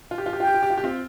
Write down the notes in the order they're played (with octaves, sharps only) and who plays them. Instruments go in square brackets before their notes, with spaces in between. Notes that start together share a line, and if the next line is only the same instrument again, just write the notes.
[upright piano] F4
G4
F4
G4
[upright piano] F4 [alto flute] G5
[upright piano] G4
F4
G4
F4
G4
C4 F4